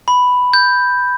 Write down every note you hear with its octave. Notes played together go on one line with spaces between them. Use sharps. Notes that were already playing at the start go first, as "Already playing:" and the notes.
B5
G6